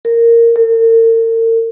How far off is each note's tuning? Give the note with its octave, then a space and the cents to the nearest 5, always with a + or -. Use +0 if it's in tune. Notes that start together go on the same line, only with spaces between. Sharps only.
A#4 -10
A#4 -45